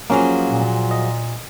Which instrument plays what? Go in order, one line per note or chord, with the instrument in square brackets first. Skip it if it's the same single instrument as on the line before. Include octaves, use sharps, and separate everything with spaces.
[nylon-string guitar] F3 F#3 G#4 [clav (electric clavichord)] A#3 C#4
[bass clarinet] A#2
[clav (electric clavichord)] D#5